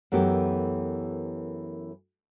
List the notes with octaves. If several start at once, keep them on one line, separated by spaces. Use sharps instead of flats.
F#2 E3 A3 B3 G4 A#4